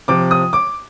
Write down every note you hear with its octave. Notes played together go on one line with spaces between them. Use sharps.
C3 F3 D6
D#6
D6